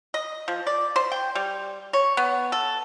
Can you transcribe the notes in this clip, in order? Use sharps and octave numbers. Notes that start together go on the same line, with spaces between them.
D#5
F3
D5
C5
G5
G3
C#5
B3
A4